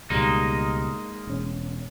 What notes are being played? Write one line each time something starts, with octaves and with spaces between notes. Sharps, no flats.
C#2 B2 G3 G#3 A#3 D#4
E1 C#4